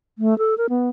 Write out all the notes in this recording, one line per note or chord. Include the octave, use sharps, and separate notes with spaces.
A3
A4
A#4
B3